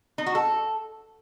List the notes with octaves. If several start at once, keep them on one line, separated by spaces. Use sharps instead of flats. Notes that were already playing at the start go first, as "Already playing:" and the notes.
D#4
F#4
A4